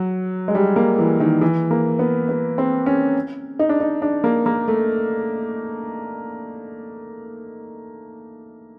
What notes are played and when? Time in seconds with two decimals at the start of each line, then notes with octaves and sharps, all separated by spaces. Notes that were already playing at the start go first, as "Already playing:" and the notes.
Already playing: F#3
0.48 G#3
0.55 G3
0.76 A#3
0.98 E3
1.20 D#3
1.41 E3
1.71 A#3
1.99 B3
2.29 B3
2.58 C4
2.86 C#4
3.59 D#4
3.69 D4
3.80 D#4
4.02 D4
4.24 A#3
4.46 A#3
4.68 A3